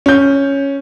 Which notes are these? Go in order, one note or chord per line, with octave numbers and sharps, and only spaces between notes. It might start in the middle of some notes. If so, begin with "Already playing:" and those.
C#4 G6